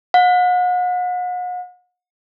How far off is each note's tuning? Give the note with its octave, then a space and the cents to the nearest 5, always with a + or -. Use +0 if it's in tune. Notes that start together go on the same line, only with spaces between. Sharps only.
F#5 -40